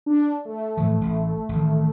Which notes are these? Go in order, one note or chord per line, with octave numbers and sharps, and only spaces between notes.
D4
A3
A2 E3 F3
A1
A1 D#3